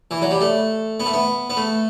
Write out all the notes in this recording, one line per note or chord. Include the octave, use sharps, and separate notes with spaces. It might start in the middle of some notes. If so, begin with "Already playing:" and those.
E3
F#3
G3
A3
B3
A3
B3
B3
A3